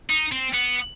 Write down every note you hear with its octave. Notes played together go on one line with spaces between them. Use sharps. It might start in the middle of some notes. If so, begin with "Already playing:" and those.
D#4
C4
B3